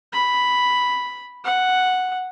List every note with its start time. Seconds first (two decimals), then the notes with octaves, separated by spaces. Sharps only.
0.13 B5
1.44 F#5